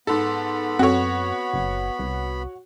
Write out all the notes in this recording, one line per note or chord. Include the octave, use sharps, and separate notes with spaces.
G#2 B3 A4 B5
F#2 C4 F#4 A4 C#5
F#1
C2